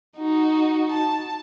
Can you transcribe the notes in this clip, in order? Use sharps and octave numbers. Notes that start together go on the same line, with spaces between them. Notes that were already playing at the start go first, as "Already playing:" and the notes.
D#4 F#4
A5